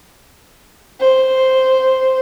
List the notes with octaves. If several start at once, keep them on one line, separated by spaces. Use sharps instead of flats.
C5